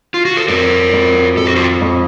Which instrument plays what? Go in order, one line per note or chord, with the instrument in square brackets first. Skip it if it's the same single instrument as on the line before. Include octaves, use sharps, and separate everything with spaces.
[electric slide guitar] F4
F#4
A4
[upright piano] F2 [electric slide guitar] F#4 A#4
[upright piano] F2
[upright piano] F2 [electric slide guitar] A4
[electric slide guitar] F#4
F4 A4
[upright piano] F2